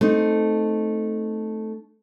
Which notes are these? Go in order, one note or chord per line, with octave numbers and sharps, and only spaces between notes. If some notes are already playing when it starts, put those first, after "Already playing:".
A3 C4 D#4